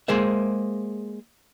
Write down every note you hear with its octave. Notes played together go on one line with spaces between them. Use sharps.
G#3 A#3 G#4 C5 E5